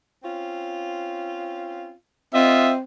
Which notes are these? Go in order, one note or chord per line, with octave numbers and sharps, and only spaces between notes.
C4 C#4 F4
C4 F4 D#5 E5